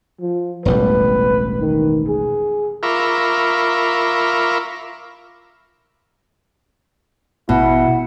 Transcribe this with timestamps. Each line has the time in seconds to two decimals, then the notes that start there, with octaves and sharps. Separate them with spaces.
0.21 F3
0.65 E1 A1 G3 B4
1.61 D#3
2.08 G#4
2.83 F4 A#4 E5 B5 C#6 D6
7.49 A1 B2 E4 F#5